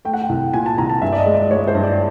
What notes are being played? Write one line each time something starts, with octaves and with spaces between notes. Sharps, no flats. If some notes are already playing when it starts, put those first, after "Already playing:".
A3 G5
F#5
G5
C2
A#2 G#5
A5
C2 A#5
A5
G2 E5
D5
D#5
G#3
D5
G#3 C#5
C5
G2
D5